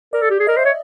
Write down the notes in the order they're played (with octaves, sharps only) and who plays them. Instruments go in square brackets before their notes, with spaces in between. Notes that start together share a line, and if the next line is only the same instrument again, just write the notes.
[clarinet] A#4 [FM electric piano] D5
[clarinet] A4
G4
G#4
[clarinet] A#4 [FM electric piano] D#5
[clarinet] C5 [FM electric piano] E5
[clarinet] C#5